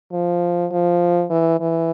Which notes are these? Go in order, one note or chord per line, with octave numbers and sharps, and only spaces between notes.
F3
F3
E3
E3